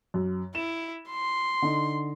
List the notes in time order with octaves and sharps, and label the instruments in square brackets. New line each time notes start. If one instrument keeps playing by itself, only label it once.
[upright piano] F#2
[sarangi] E4 [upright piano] E7
[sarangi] C6
[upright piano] D3 D#4